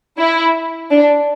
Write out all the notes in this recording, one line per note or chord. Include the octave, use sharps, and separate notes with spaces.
E4
D4